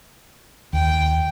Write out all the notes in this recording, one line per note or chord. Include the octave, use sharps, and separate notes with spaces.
D#2 G5